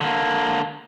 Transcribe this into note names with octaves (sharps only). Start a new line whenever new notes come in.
D3 A#3